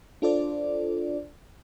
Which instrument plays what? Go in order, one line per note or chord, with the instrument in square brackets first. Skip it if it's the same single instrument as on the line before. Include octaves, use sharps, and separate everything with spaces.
[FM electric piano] D4 F4 A4 C5 D5